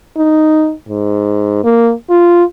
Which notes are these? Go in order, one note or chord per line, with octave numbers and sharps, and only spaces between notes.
D#4
G#2
A#3
F4